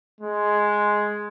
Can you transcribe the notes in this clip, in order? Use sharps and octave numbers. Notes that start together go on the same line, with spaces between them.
G#3